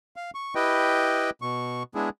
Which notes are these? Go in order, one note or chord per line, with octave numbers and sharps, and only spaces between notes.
F5
C#6
E4 G4 B4 D#5 G5
B2 C#6
G#3 B3 D4 E4 G#4